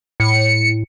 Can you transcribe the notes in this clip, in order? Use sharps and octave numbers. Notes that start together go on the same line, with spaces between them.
A2 C#7